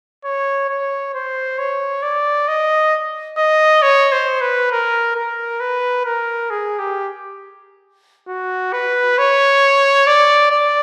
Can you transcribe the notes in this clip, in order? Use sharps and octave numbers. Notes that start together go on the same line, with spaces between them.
C#5
C#5
C5
C#5
D5
D#5
D#5
C#5
C5
B4
A#4
A#4
B4
A#4
G#4
G4
F#4
B4
C#5
D5
D5